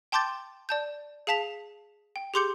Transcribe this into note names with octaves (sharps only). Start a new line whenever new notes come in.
G5 A5 C6 D6 G6 A6
D5 A5 G6
G#4 F5 A5 B6 F7
G5
G4 G#4 C6 D6 G6 C#7